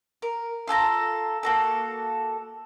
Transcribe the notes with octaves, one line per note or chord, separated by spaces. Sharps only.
A#4
F4 A4 G#5 A#5
A#3 F#4 A4